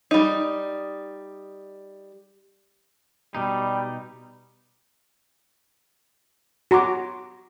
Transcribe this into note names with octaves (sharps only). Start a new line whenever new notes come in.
G3 D#4
B2 G3 D#4
F#4 A#5 C6 D6